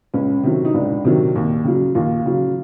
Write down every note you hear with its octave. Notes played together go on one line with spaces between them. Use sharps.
C#2 C#4
C3 D#3 F#3
D#4
C#2 D4
C3 D#3 F#3
D#2
C#3 F#3
D#2 F4
C#3 F#3